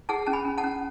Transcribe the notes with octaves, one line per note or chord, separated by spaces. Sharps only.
G#4 F#5 A5
C#4 A5
G#5 B5
C#4
F#5 A5
C#4